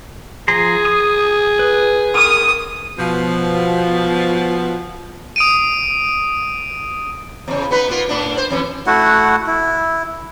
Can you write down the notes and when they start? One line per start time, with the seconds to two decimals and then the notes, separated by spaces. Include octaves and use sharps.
0.48 F3 G#4 A#5 C6
0.85 D#6
1.59 B4
2.15 A#4 D#6
2.99 B2 F3
5.36 D#6 D7 D#7
7.48 E2 C#3
7.71 B3 D#4 B4
7.88 A#3 B3 F4
8.09 A2 B3 D4
8.37 C5
8.50 F2 E3 C#4
8.87 A3 E4 F#4 F#5
9.47 E4